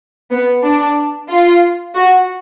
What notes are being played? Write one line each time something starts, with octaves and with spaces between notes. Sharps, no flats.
B3
D4
F4
F#4